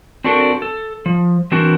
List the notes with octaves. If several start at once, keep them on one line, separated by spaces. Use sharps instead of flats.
C4 D4 F#4 A4 A#4
A4
F3
E3 C4 D4 F#4 A#4